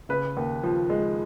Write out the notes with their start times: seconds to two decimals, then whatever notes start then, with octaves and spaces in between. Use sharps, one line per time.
0.09 C#3 B4
0.37 D#2
0.63 F3
0.90 G#3